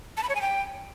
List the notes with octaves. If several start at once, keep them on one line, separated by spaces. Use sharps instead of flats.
A5
B5
C#5
G#5
G5